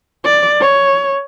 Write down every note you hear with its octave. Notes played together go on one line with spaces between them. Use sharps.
D5
C#5